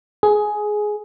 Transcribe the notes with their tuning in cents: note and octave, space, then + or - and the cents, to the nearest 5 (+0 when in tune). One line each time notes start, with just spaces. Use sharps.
G#4 +10